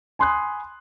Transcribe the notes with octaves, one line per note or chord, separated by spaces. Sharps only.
G#5 B5 C6 D#6 F#6